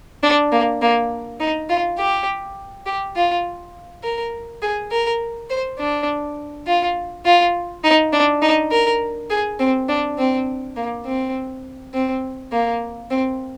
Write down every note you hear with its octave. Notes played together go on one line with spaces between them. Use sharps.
D4
A#3
A#3
D#4
F4
G4
G4
F4
A#4
G#4
A#4
C5
D4
F4
F4
D#4
D4
D#4
A#4
G#4
C4
D4
C4
A#3
C4
C4
A#3
C4